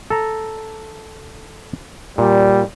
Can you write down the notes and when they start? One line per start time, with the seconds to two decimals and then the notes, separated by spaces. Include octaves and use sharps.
0.10 A4 A#5
2.18 A#2 G3